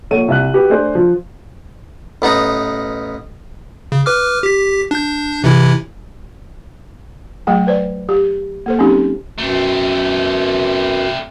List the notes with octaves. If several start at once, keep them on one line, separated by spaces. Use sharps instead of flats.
A#1 A4 C#5 F#5 D#7
C2 E5 F#6
F#4 G4 B4
A3 D4 G#4 C5 D5
F3
A1 B3 D#4 A#5
C#3
B4 D6 F6
G4 B6
D4 G6
C3 E3 E4
F#3 A3 G#4 G5
B4 C5 D5
G4
A#3 A4 C5
F#3 C4 C#4 D#4 G4
F#2 B2 A3 C4